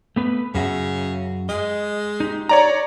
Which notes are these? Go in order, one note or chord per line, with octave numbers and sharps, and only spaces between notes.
A3 B3 B4
F#2 C#3 F#4 E5
G#3 D#5
D#4 G4
C#5 D5 A#5